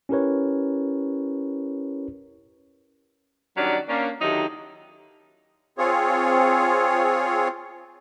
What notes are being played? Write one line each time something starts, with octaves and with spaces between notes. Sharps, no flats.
C#4 E4 G4 A#4 B4 C#5
D#3 F#3 G3 C#4 D4 D5
A#3 C#4 D4
D3 D#3 F#3 D#4 E4 G4
C4 F4 G#4 C#5